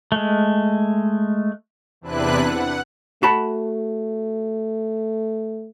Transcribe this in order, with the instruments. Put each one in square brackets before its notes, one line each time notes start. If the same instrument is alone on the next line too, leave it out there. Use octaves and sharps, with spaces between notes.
[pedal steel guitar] G#3 A3
[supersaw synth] E2 C3 D4 E4 B4 F#6
F#5
[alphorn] A3 [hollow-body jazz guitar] F#4 A5 B5